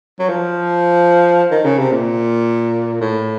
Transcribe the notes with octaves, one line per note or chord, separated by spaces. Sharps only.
F#3
F3
D#3
C#3
C3
A#2
A2